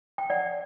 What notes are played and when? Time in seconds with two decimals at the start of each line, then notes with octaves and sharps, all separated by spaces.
0.18 G5
0.30 D5 F#5